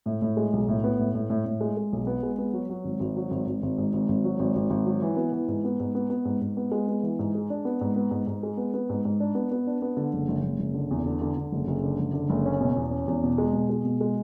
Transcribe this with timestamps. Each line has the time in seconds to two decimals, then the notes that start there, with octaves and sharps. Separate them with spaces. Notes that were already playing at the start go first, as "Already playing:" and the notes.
0.06 A2
0.22 A2
0.37 G#3
0.53 B1
0.68 A2
0.84 B3
0.99 A2
1.14 A2
1.30 A2
1.46 A2
1.61 G#3
1.77 G#3
1.93 B1
2.07 B3
2.23 G#3
2.38 B3
2.53 F#3
2.70 F#3
2.84 G#1
3.00 G#1
3.16 F#3
3.31 G#1
3.47 G#1
3.63 G#1
3.78 G#2
3.93 G#1
4.08 G#1
4.24 F#3
4.39 G#1
4.56 G#1
4.70 G#1
4.86 F#3
5.02 E3
5.17 B3
5.32 E3
5.48 G#2
5.64 B3
5.80 G#2
5.95 B3
6.10 B3
6.25 G#2
6.41 G#2
6.57 B3
6.71 G#3
6.88 B3
7.03 E3
7.19 G#2
7.35 G#3
7.50 D4
7.65 B3
7.81 G#2
7.96 B3
8.11 G#2
8.27 G#2
8.43 G#3
8.57 B3
8.74 B3
8.90 G#2
9.05 G#2
9.20 D4
9.35 B3
9.51 B3
9.67 D4
9.82 B3
9.97 D3
10.13 F#1
10.28 F#1
10.43 F#1
10.59 F#1
10.74 D3
10.91 E2
11.06 D3
11.22 D3
11.37 D3
11.52 F#1
11.67 F#1
11.84 D3
11.99 F#1
12.14 D3
12.30 F#1
12.45 C#4
12.60 B2
12.76 E2
12.91 C#4
13.08 E2
13.23 B2
13.38 G#3
13.53 B2
13.70 G#3
13.85 B2
14.01 G#3